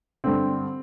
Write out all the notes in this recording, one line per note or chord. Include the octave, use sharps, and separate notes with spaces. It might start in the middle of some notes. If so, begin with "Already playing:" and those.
G2 D3 C4